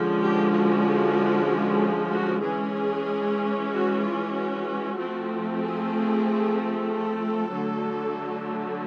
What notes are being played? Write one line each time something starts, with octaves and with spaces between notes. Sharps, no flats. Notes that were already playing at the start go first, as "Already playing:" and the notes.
Already playing: D3 F3 G#3 C#4
G4
F#4
F#4
E3 G#3 C#4 G#4
F#4
F4
F#4
F3 A3 C4
G#4
A4
D3 F#3 A3